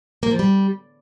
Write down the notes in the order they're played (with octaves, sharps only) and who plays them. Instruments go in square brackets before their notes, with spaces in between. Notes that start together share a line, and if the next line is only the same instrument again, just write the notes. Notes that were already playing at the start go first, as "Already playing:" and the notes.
[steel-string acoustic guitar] A#3
F3
G3